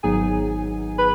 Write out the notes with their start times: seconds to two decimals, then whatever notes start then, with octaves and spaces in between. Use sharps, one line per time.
0.03 G#1 G#2 F#3 B3 D#4 G#4 G#5
0.98 B4 B5